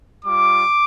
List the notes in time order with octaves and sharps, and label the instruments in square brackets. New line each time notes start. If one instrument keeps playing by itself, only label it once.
[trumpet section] G3 F4 D6